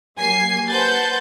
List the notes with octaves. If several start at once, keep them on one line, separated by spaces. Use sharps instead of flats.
F#3 A#3 G4 G#5 C7
B4 C5 F#5 A5 G6 A6